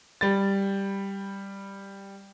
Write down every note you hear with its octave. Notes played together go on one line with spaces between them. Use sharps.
G3 A6